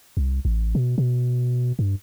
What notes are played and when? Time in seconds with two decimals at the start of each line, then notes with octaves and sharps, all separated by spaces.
0.17 C2
0.45 A1
0.75 B2
0.98 B2
1.79 G2